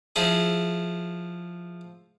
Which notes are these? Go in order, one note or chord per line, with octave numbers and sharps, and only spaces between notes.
F3 E4 G#4